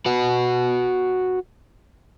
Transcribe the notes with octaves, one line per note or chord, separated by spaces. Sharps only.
F#4 B4